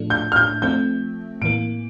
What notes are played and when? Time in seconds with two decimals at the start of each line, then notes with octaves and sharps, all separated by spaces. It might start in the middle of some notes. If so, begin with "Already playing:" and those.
Already playing: A2 F3 A3 D4
0.10 G6
0.32 F6
0.36 G6
0.62 F3 A3 C4 G6
1.42 A2 E3 A#3 D7